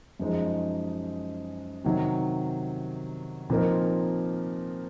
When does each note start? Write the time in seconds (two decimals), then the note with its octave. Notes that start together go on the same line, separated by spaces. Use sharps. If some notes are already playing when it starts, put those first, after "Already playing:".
0.20 F#2 F3 G#3 D#4
1.84 C3 D#3 F#3
3.50 A#2 F3 C4 D#4 A#4